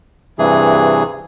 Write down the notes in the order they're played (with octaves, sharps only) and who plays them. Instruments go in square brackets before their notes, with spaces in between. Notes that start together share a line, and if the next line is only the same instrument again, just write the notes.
[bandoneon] G2 C3 E3 G#4